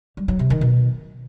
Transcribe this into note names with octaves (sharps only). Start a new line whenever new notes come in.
G3
F#3
C3
D#3
B2